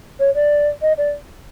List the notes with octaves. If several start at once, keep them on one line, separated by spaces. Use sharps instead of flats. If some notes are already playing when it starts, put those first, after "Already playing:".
C#5
D5
D#5
D5